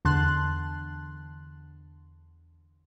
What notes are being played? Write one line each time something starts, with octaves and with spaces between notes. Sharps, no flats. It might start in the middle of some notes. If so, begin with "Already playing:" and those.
E2 D3 A5 C6 F#6